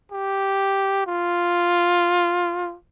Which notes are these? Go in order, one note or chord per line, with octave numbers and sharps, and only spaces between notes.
G4
F4